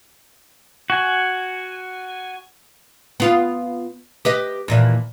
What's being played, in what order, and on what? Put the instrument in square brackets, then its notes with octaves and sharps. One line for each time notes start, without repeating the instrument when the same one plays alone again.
[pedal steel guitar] F#4 G#5
[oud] B3 F4
G4 B4 D#5
D#2 A#2 E3